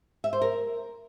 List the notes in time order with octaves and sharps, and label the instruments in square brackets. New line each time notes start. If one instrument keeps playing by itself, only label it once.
[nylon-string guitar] E5
C5
A#4